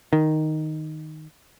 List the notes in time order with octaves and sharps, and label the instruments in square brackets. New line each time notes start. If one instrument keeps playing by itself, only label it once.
[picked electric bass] D#3